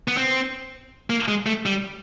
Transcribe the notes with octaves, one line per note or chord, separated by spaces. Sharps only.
B3
C4
A#3
G#3
A3
G3